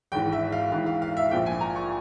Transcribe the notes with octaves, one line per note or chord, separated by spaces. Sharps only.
G#1 G#2 E3 G5
E5
F5
G#1 G#2 E3 F5
F5
F5
E5
A#1 A#2 F3 G5
G#5
A#5
C#6